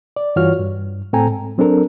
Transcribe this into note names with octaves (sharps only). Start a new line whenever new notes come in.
D5
G2 E3 F4 F#4 C#5 F6
G2
A2 C4 A4 G5 G#5 A#5
G#2
F#3 C4 D4 A4 A#4